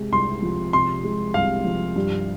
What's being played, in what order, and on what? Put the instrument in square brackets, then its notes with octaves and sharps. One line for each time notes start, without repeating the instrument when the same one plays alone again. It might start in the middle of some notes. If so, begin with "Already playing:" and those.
Already playing: [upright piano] C3 G#3
[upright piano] C2 [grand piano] C6
[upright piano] F3
[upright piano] C3 [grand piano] C6
[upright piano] G#3
[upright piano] C2 [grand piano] F5
[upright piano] F3
G2